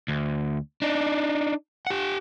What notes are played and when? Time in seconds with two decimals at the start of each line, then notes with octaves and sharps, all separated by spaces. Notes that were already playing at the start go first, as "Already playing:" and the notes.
0.08 D2
0.82 D4 D#4
1.87 G4 F#5